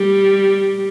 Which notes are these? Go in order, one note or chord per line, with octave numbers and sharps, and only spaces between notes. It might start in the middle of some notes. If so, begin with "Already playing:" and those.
Already playing: G3